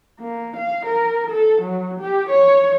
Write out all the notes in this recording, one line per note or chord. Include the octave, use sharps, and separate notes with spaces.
A#3
F5
A#4
A4
F#3
G4
C#5